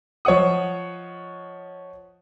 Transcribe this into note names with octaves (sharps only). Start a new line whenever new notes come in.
F3 C#5 D#5 F#5 D#6